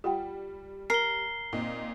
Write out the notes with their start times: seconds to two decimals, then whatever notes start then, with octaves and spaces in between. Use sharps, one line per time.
0.04 G3 F4 F#5 G5
0.90 A#4 C7 G7
1.53 A#2 C4 D#4